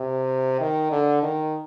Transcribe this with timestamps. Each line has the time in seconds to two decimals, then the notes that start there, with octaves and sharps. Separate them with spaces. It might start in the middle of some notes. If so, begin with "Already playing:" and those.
Already playing: C3
0.61 D#3
0.91 D3
1.23 D#3